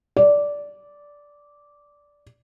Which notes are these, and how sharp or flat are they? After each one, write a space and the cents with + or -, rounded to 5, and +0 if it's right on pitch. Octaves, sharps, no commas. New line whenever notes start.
D5 -10